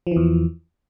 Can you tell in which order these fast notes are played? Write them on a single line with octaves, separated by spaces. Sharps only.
F3 E3 E2